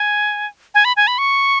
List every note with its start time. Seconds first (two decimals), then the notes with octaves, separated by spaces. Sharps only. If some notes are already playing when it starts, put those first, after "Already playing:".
Already playing: G#5
0.75 G#5
0.85 B5
0.97 G#5
1.07 B5
1.18 C#6